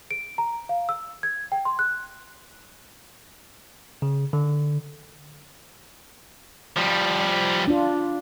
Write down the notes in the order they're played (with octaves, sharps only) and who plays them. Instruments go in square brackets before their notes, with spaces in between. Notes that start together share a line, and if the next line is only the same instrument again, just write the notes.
[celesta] D7
A#5
F5
E6
G#6
G5
C6
F#6
[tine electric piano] C#3
D3
[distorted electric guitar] F3 G3
[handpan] D4 F4